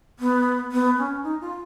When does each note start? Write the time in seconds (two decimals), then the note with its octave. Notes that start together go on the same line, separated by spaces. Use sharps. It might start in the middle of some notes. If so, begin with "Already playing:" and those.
0.19 B3
0.72 B3
0.98 C#4
1.23 D#4
1.41 F4